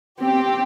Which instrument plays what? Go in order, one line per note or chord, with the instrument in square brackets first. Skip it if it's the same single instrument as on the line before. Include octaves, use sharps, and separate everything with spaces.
[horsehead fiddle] C4 [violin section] G4